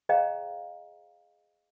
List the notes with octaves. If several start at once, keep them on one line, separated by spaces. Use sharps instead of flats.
G#4 C5 D#5 F5 G5 A#5